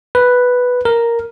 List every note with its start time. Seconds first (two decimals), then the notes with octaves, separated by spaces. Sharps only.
0.15 B4
0.85 A#4